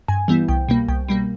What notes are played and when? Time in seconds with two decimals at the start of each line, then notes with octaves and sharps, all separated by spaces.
0.08 G2 G#5
0.28 E3 G3 B3 E4
0.48 C2 G5
0.68 B2 G3 A#3
0.88 C2 G5
1.09 B2 G3 A#3